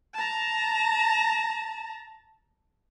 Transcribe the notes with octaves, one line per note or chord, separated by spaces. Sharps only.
A5 A#5